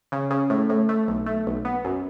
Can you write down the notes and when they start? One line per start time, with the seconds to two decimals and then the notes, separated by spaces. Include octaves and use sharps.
0.12 C#3
0.30 C#3
0.50 A2
0.69 A2
0.89 A3
1.08 B1
1.26 A3
1.46 B1
1.65 B3
1.85 F#2